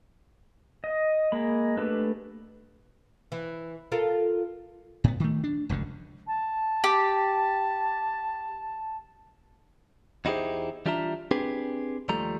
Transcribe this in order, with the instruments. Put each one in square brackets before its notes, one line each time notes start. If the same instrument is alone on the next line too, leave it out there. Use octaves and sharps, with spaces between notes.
[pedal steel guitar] D#5
G#3 A#3 B5
A3 D4 G4 A4 B4
[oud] E3
F4 A4 A#4
[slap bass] A2 B3
D#3 A3
D4
F1 C#2 F#2 D3
[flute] A5
[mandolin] G4
[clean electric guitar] E2 D#4 E4 G4 G#4 C5
E3 G3 D4 F4 E5 A#5
C4 D4 G4 G#4 B4
D#2 F3 G3 A3 A#5